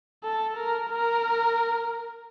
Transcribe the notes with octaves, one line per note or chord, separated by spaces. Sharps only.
A4
A#4
A#4